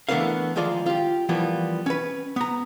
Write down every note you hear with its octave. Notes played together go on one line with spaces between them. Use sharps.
E3 A3 B3 D4 A#4 F5
D#3 F3 G#3 F4 D5
F4 G4
E3 F3 G3 A#3 B3
C#4 B4
B3 A#5